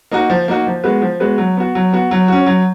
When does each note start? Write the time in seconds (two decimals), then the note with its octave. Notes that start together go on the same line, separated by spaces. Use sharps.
0.11 A#3 D#4 F#4
0.30 F3
0.48 A#3 D#4 F#4
0.67 F3
0.84 G#3 B3 F#4 B4
1.02 F3
1.20 G#3 B3 F#4 B4
1.38 F#3
1.57 B3 F#4
1.75 F#3
1.93 B3 F#4
2.11 F#3
2.28 C#4 F#4
2.46 F#3